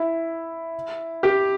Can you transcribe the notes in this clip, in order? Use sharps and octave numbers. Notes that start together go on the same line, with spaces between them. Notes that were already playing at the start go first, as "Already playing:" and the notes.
Already playing: E4
G4